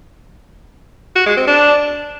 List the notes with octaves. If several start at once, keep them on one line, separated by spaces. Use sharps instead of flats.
F#4
G#3
C4
D4